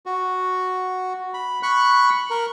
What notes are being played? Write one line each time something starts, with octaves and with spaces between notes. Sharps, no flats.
F#4
B5
B5 C#6 F#6
A#4